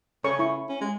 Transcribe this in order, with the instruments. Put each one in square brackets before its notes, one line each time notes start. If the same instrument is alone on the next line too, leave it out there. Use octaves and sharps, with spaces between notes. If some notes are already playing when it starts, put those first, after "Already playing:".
[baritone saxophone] C#3 [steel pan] A4 C#5 C#6
[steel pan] E4 C#6
[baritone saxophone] C#4
G#3